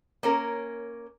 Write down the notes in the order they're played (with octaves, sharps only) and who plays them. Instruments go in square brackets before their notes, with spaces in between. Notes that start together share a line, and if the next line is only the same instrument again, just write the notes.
[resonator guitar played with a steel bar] A#3 C#4 A#4